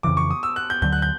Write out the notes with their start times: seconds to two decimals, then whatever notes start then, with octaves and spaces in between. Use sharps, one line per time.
0.03 F2 C#3 E3 D6
0.17 C#6
0.30 D#6
0.43 E6
0.56 F#6
0.70 G6
0.82 D2 D3 F#3 G6
0.93 F#6
1.02 G6